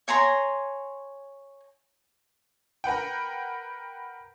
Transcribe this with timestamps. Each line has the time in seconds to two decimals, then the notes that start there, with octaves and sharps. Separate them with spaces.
0.08 C#5 G#5 A#5 C6
2.84 A#4 B4 F#5 G5